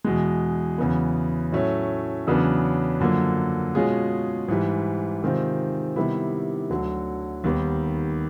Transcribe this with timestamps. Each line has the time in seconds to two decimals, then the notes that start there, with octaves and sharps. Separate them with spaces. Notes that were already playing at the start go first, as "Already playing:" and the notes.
0.05 E2 B2 G#3
0.78 E2 C#3 F#3 B3
1.52 A2 F#3 A3 C#4
2.27 E2 C#3 F#3 B3 D4
3.00 F#2 D3 F3 A#3
3.75 B2 G#3 C#4 F4 G#4
4.48 G#2 E3 G3
5.23 C3 D#3 G#3 C4 F4
5.96 C3 D#3 G3 B3 E4
6.70 D2 D3 F#3
7.44 D#2 D#3 G3 B3